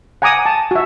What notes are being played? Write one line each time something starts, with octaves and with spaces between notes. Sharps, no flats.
F#5 G#5 A#5 D6 D#6
A5
F#4 E5